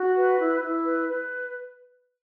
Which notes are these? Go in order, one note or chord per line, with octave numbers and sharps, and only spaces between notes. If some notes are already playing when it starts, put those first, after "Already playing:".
Already playing: F#4
B4
E4
E4
B4
B4